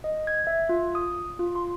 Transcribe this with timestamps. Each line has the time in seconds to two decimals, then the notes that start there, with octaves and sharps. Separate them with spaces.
0.04 D#5
0.27 G#6
0.47 E5
0.69 F4
0.95 D#6
1.39 F4
1.55 C6